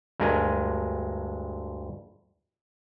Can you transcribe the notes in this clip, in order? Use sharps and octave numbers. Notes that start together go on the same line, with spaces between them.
D2 G2 G#3 A#4 G#5